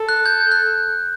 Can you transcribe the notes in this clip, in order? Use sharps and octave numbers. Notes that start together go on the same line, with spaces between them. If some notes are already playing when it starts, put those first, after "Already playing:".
Already playing: A4
F#6
G6
F#6